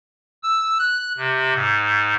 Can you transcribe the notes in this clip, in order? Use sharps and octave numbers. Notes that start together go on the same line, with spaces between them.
E6
F#6
C3
G#2